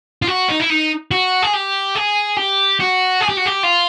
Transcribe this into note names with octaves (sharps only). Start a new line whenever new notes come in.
F4
F#4
D#4
E4
D#4
F#4
G#4
G4
G#4
G4
F#4
G#4
G4
F#4
G4
F4